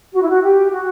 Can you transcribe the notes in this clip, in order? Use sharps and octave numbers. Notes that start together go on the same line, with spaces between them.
F#4
E4
F#4
G4
F#4